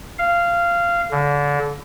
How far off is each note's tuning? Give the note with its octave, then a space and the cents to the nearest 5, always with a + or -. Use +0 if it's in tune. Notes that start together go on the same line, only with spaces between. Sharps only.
F5 -15
D3 -30